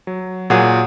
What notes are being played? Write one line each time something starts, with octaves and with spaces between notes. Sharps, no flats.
F#3
A#2 F#3 G#4 F#5 D#6